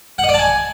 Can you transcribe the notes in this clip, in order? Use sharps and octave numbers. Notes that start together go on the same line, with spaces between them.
F#5
D#5
D5
A5
G#5